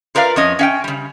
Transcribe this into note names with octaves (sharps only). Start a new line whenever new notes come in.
F4 A#4 B4 D5 F5
F2 C#4 D#5
C#4 F5 G5
C#3 G3